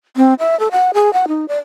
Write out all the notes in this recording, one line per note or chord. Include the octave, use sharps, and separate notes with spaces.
C4
E5
A4
F#5
G#4
F#5
D#4
D5